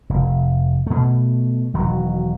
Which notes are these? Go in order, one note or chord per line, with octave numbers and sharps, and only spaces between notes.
F1
B2 A3
E1 D#3 F#3